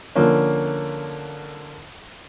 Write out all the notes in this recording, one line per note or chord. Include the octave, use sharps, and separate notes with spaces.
D3 F3 A#3 C#4